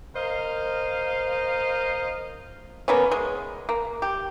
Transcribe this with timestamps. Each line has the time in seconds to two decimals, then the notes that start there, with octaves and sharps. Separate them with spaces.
0.16 A#4 C5 D#5 F5
2.88 A#3 B3 C#4
3.11 G#3
3.69 A#3
4.02 G4